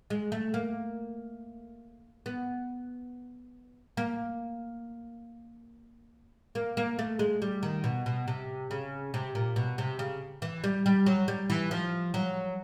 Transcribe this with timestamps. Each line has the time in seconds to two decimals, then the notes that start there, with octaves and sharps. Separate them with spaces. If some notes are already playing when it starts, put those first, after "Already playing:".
0.10 G#3
0.32 A3
0.54 A#3
2.26 B3
3.97 A#3
6.55 A#3
6.77 A#3
6.99 A3
7.19 G#3
7.42 G3
7.63 D#3
7.84 B2
8.06 B2
8.28 C3
8.71 C#3
9.14 C3
9.35 A#2
9.56 B2
9.78 C3
9.99 C#3
10.42 E3
10.64 G3
10.86 G3
11.06 F#3
11.28 G3
11.50 E3
11.71 F3
12.14 F#3